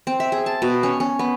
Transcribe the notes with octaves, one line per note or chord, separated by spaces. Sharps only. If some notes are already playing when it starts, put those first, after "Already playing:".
C4
E5
G#4
A5
B2
C#4
C#4
B3